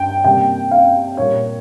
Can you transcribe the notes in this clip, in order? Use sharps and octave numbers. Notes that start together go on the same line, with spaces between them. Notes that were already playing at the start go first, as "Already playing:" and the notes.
Already playing: G2 G5
C3 G3 A#3 G5
F5
A#2 G3 A#3 C#5